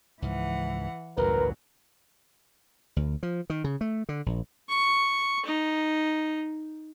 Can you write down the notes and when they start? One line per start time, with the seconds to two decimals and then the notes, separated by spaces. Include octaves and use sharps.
0.22 C#2 G#2 E3 F3 F#5
1.17 A1 D2 G2 A#2 F#3 A#4 B4
2.96 D2
3.23 F3
3.50 D#3
3.64 C#3
3.81 A3
4.09 D3
4.26 A#1
4.69 C#6
5.46 D#4